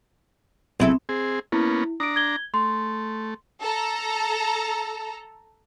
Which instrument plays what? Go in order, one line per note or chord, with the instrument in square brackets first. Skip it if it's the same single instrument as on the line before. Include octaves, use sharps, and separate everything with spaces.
[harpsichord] B1 [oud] C#3 E4 A4 [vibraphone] C4
[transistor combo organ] C4 G#4
[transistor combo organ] A#3 B3 C#4 [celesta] E4
[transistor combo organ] D4 A#5 [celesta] D#6 D7
[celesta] G#6 G7
[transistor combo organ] A3 [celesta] C6
[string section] A4 A#5